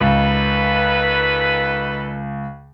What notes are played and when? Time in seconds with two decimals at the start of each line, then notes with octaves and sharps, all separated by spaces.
0.01 C#2 D#3 A4 B4